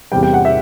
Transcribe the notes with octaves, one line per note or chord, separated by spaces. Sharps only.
E2 C3 G3 G5
G5
F#5
E5